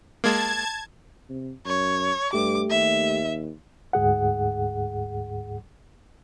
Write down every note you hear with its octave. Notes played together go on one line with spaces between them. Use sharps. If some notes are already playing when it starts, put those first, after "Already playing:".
G#3 A#3 A5 G#6
C3
F#2 C#5
G2 A3 G4 D6
D#2 E5
D2 G#2 G#4 F#5